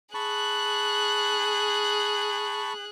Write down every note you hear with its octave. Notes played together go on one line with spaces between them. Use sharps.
G#4 A5 B5 C#6 F#6